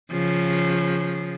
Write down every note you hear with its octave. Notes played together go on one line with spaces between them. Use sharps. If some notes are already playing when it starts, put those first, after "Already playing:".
C#3 F3